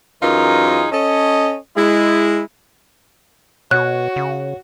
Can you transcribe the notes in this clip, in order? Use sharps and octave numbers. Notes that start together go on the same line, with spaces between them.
F#2 E3 D#4 F4 G#4 A#4
C#4 A4 D#5
G#3 E4
B2 F#4 C#5 F#6
C#3